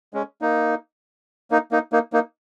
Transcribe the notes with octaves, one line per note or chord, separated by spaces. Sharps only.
G#3 C#4
A#3 D#4
A#3 D#4
A#3 D#4
A#3 D#4
A#3 D#4